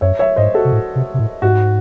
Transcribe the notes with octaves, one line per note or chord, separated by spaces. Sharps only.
F#2 C#5 E5
C#5 E5
G#2 C5 D#5
F#4 A4
C3
A2
C3
C3
A2
G#2 F#4